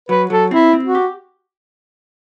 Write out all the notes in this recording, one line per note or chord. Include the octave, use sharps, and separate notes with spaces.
F#3 B4
F#3 A4
C4 E4
C4
F#4
G4